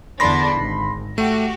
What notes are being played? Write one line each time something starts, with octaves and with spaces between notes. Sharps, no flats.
E2 D3 D4 B5 C6 A#6
G#1
A3 F#4 G4